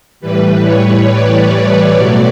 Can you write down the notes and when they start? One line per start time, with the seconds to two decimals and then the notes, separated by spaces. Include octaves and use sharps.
0.20 A2 E3 G3 B4
0.64 C#5
1.07 D5
1.51 D5
1.94 B2 F#3 A3 D5